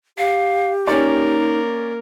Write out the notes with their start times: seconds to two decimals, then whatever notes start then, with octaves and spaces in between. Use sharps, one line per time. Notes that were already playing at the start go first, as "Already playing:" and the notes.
0.18 G4 F5
0.87 A#3 C#4 D#4 A#4 D5